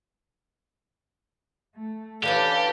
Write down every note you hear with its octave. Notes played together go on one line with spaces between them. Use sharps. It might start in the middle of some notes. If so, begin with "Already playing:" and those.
A3
D3 E3 C#4 G4 A4 D5 F5